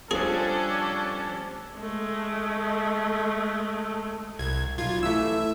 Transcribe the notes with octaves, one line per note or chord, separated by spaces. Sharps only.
F3 G3 C#4 D4 G#4 A4 C5
G#3 A3
C2 G#6
B1 F4 G#6
E3 A3 E5 E6